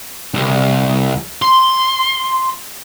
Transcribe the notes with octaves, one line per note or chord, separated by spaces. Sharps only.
C2
C6